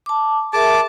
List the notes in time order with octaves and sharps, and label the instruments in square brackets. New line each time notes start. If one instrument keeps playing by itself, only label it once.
[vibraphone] A5 D6
[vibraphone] G#4 A#4 E5 [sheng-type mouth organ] A5 D6